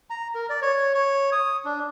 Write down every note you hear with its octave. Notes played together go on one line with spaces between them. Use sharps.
A#5
A#4
D5
C#5
C#5
D#6
D4